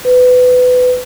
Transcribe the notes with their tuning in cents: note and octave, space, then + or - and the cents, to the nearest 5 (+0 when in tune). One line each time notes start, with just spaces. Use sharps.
B4 +20